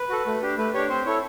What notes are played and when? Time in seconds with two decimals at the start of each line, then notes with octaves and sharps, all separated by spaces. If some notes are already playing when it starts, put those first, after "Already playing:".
Already playing: B4
0.09 F#4 A4
0.26 A3
0.42 D4 G4
0.58 A3 B4
0.74 D4 G4 C#5
0.89 C4 C5
1.06 E4 A4 C#5